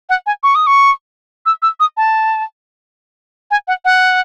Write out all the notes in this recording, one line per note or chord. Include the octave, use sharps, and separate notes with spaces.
F#5
G#5
C#6
D#6
C#6
E6
E6
D#6
A5
G#5
F#5
F#5